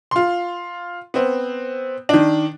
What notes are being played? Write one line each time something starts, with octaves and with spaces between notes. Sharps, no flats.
F4 C6
B3 C4
D#3 D4